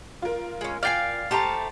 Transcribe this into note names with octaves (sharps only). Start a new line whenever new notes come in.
F4 A#4
G#3 C#4
D5 F5 G5 G#5 F6 A6 C7
A3 G4 C5 A5 A#5